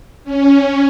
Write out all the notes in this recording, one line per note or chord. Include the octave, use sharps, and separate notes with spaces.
C#4